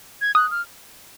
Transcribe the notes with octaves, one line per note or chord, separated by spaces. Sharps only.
G#6
D#6 F#6
F6